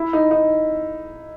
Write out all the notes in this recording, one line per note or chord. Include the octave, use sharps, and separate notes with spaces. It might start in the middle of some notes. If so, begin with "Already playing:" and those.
Already playing: E4
D#4
D#4